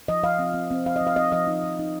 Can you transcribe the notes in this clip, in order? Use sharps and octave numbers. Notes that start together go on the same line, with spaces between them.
F3 D#5
F3 F5
C4
C4
C4
F3 F5
D#5
F3
F5
C4 D#5
F3 D#5
D#4
F3
D#4